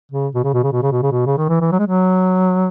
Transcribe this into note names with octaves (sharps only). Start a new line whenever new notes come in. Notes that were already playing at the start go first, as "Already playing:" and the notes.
C#3
B2
C#3
B2
C#3
B2
C#3
B2
C#3
B2
C#3
D#3
E3
E3
F#3
G#3
F#3